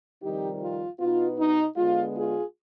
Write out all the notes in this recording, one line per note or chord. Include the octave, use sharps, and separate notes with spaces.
F2 C3 D#3 G3 D#4 G4
F4
B2 B3 D#4 F4
D#4
D3 G#3 B3 F4
F4 G#4